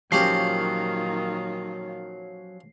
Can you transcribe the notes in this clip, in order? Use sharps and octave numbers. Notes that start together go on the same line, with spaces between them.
A#2 D#3 F3 F#3 C#4 F4 G4 C7